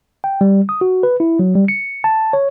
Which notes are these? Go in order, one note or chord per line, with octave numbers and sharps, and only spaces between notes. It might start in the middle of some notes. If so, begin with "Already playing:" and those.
G5
G3
D#6
F#4
B4
E4
F#3
G3
C#7
A5
C#5